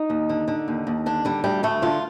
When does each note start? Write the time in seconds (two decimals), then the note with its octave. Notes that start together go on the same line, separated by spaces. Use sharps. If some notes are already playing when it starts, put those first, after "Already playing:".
Already playing: D#4
0.10 D#2
0.29 D3
0.48 D3
0.68 D#2
0.87 D#2
1.06 D3 D4
1.25 D3 G3
1.44 D2 G3
1.63 D2 A3
1.82 D3 F4